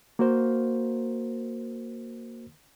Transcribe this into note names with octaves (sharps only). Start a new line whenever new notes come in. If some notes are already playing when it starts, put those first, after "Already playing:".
A#3 F#4 A#4 C5